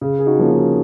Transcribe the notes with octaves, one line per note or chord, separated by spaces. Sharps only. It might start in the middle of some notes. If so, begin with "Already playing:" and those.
C#3
G#4
D#4 F#4
F3 A#3 C#4
D#4 F#4